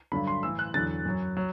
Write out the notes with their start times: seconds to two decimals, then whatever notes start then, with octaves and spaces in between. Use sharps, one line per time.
0.12 G2 D3 F#3 B5
0.27 C6
0.43 A2 E3 E6
0.59 F#6
0.74 E2 D3 F#3 A6
1.05 F#2 F#3
1.37 F#3